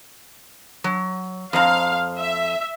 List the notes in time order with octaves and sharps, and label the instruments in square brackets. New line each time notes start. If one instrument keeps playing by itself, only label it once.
[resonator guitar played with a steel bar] F#3
[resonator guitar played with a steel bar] F2 C5 A#5 [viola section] F5
[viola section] E5